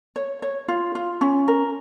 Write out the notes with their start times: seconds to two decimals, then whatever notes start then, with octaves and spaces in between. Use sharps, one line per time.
0.16 C#5
0.42 C#5
0.68 F4
0.95 F4
1.21 C#4
1.48 A#4